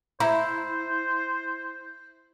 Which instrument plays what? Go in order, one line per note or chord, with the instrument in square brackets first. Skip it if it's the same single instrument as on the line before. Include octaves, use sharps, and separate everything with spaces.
[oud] E4 [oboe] C5 [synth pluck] E5 A#5